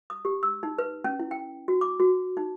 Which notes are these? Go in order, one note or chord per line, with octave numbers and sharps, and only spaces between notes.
D#6
G4
E6
D#4
B4
C#4
E4
G5
F#4
D6
F#4
D#4